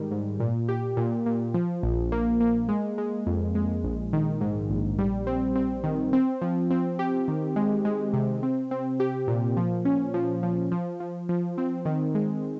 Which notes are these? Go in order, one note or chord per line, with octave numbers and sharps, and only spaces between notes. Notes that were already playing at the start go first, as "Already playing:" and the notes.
Already playing: G#2 D#3 G3
G#2
A#2
G4
A#2
A#2
F3
A#1
A#3
A#3
G#3
G#3
F2
G#3
A#1
D#3
G#2
A#1
G3
C4
C4
D#3
C4
F3
C4
G4
D#3
G#3
G#3
C3
C4
C4
G4
A#2
F3
C#4
F3
F3
F3
F3
F3
C4
D#3
G#3